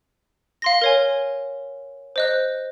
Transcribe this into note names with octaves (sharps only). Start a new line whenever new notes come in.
F5 C6 A#6
A#4 C#5 G#5
C5 D#5 F#6